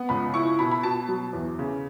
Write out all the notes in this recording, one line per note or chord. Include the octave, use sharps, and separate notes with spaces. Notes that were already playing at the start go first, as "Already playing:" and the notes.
Already playing: B3
C#2 B5
E4 C#6
B2 B5
B5
B2 A5
F#3
E2
C#3